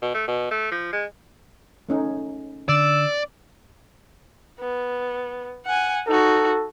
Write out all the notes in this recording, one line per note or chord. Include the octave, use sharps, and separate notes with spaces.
B2
A3
B2
A3
F3
G#3
A3 C#4 D#4
D3 D5 E6
B3
F#5 G#5
D#4 F#4 A4